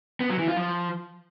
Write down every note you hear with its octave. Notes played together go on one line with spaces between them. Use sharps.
B3
F#3
E3
F4
F3